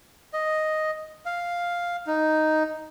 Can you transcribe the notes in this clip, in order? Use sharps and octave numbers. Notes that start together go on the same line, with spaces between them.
D#5
F5
D#4